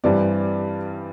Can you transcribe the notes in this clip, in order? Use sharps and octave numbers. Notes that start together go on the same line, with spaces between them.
G2 E3 G3 C4 D5